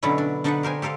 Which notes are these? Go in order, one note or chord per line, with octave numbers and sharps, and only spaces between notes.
B2 D3 F#3 B3 C#4 E4
D4
D3 D4 D#4 B4 D#5 F#5
G4 A#4 C5 G#5
G4 A4 A#4 C5 F5